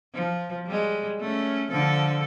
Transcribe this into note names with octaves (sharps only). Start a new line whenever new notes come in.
F3
G3 G#3
A3 C#4
D3 F3 A4